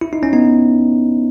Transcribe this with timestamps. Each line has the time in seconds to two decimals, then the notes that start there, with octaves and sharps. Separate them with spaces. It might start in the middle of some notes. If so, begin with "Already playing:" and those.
0.01 E4
0.13 D#4
0.23 C#4
0.33 B3 D#4